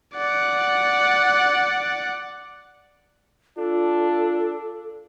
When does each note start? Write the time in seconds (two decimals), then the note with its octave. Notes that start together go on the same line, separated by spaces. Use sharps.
0.15 D5 F#5
3.58 D4 F4 A4